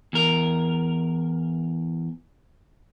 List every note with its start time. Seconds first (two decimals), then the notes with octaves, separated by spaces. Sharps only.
0.13 E2 A#4